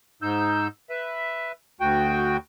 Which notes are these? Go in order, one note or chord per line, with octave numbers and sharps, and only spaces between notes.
G#2 D#4 E6 G6
B4 E5
D2 F#4 G5